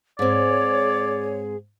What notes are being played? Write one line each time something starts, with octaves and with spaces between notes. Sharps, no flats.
G#2 C4 G#4 C#5 D5